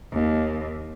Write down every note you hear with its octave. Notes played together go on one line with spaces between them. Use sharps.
D#2